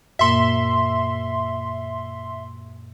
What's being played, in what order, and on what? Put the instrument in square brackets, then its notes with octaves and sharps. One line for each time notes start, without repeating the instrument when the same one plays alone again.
[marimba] F#2 A#2 A#3 [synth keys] E5 C6